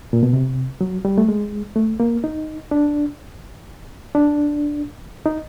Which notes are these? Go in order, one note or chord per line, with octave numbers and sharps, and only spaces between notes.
A#2
B2
C3
F#3
G3
A3
G#3
A3
A#3
D#4
D4
D4
D#4